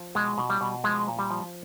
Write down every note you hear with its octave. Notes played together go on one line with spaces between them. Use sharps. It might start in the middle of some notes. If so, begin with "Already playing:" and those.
Already playing: F3
B2 G#3
B2
G3
B2
F3 G#3
A#2
G3
F3